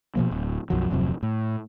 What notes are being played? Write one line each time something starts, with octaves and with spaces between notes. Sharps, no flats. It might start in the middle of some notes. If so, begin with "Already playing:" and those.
B2 D#3 F3 A#3
D1
B1 F#2 F3 F#3
D1 F2 C3 F#3
A2